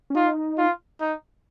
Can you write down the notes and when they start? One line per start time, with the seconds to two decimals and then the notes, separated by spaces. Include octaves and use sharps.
0.10 C#4
0.15 D#4 F4
0.58 F4
1.00 D#4